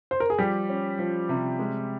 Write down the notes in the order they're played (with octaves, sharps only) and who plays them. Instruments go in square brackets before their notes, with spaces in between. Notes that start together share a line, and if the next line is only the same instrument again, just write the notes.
[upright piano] C5
A#4
G#4
[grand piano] F3 [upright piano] G3 G4
[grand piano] C#4
F3
C3
G#3